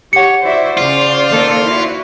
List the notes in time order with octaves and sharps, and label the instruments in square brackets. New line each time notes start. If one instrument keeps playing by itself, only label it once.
[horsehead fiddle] G4 C#5 [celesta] F#5 C#7
[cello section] E4 F#4 E5 [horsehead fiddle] C5 D5
[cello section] C#3 [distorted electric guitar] F4
[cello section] D#3 A#3 A4
E4 F#4